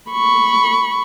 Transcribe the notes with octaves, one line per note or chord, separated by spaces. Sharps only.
B5 C#6